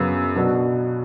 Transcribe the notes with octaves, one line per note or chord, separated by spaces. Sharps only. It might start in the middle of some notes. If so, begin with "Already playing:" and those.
Already playing: F#2 C#3 F#3 B3
B2 F#3 B3 D4 F#4